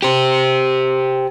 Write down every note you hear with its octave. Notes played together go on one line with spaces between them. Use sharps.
G4 C5